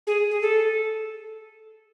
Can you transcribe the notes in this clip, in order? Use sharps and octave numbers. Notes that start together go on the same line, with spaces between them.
G#4
G#4
A4